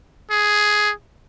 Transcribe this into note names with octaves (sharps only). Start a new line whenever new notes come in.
G#4